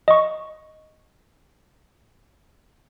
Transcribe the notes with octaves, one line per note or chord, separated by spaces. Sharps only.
D#5 C#6